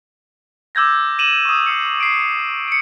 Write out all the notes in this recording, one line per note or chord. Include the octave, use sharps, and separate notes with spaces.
D6 E6 G6 G#6 A#6
D#7 E7 F#7
C#6 D#6
E6 C7 C#7
C7 D7
C#7 D7